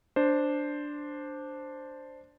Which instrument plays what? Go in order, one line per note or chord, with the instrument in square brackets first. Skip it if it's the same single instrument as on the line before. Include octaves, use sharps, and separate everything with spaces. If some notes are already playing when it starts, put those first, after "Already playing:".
[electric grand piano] D4 C5